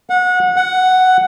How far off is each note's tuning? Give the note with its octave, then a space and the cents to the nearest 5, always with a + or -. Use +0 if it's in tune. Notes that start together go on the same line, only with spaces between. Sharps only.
F#5 -25
F#5 +5